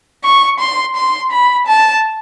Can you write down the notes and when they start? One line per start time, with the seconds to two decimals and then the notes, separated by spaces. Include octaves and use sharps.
0.24 C#6
0.60 C6
0.96 C6
1.31 B5
1.67 A5